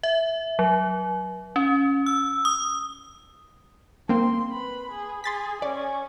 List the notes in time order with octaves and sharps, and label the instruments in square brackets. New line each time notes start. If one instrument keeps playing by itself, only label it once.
[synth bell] E5
F#3
C#4
E6
D#6
[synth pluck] A#3 C4 [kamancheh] C6
[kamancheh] B4 B5
G#4
[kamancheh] G#4 [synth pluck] C6 A6 B6
[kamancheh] C#4 G#5 [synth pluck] D5